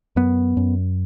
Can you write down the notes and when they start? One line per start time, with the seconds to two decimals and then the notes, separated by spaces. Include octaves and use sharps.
0.16 F#2 B3
0.57 F#2